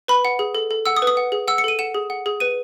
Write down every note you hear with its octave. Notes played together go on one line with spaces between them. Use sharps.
B4 B5
F#5
G#4
A4
A4
F#5 E6
D#6
B4
D#6
F#5
G#4
F#5 E6
C#7
A4 D#7
F#5 E7
G#4
F#5
G#4
B4 D#7